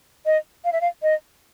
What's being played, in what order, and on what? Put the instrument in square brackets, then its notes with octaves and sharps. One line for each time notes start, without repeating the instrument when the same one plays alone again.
[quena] D#5
F5
E5
F5
D#5